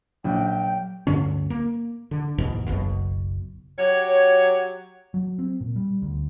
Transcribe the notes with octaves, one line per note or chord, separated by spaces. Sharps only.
A#1 F#3 G5
D2 G2 D3 C#4
A#3
D3
D#2 G#2 B2 E3
F#1 B1 B2
F#3 G4 C#5
F#3
C4
A#2
G3
D2